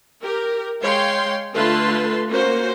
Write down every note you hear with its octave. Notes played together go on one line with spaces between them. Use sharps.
G4 A#4
G#3 C#5 F5 G5 C6
D3 A3 F4 B4 A5 C6
A#3 C#4 F#4 C5